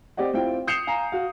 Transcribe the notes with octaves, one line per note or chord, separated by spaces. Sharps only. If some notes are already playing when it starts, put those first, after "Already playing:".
C4 G4 D5 D#5 F#5
C4 E4 F4 G5
D#6 G6 C7 C#7 E7 F7
F5 G#5 A#5 C7
F#4 F5